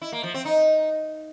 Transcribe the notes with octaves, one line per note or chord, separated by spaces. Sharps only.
E4
A#3
F3
C4
D#4